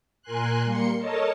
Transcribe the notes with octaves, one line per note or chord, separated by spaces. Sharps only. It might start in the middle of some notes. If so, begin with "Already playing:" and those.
A#2 A#4 G#5 C6 F#6
G3 A#3 C6 C#7
A4 A#4 C#5 D#5 A5